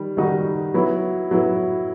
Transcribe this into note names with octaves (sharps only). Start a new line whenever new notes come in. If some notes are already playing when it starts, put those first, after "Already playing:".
Already playing: D#3 G3
D#3 G3 D#4 F#4
F#3 B3 E4
F#3 B3 E4